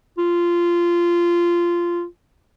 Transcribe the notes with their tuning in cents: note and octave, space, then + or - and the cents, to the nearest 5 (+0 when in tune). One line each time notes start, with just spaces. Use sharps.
F4 -15